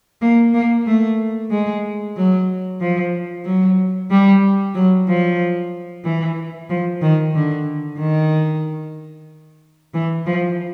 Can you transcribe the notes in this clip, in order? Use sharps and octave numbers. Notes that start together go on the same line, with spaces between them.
A#3
A#3
A3
G#3
F#3
F3
F#3
G3
F#3
F3
E3
F3
D#3
D3
D#3
E3
F3